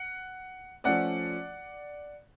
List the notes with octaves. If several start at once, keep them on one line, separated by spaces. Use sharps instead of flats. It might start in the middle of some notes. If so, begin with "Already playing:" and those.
Already playing: F#5
F3 A3 C#4 D5 F#5